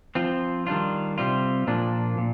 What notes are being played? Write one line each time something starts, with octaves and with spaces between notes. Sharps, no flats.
F3 C4 F4
D#3 G3 D4 F4
C3 G3 C4 F4
A#2 F3 A#3 D4
A#2